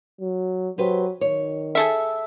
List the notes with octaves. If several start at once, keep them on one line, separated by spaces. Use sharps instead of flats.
F#3
F#3 G4 B4 C5
D#3 C#5
G#4 A4 E5